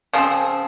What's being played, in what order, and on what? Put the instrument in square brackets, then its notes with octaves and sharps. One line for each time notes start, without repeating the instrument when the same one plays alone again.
[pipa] C#3 F3 C4